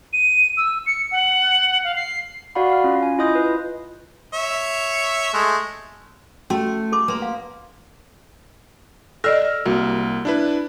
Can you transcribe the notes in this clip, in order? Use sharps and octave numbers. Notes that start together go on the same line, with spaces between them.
D#7
E6
C#7
F#5
F5
C7
F#4 D5 F5 F#5 B5
F5 F6
C#4 F4
G#5
E4 F4 D#5 D#6 G6 A#6
B4
C#5 E5
G#3 A3
A3 C#4 F#4 C6
A4 C6 D6
A#3 B4 C6
F5
A4 D5 D#5 E6 F6 A#6
C2 A#3 F#4
D4 E4 B4